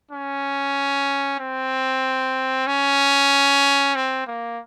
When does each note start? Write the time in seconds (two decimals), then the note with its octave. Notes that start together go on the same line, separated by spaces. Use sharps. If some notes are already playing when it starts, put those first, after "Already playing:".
0.11 C#4
1.40 C4
2.67 C#4
3.95 C4
4.27 A#3